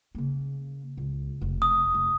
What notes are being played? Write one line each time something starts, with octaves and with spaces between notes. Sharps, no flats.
C#3 A#3
C#2
F1
D#6
F1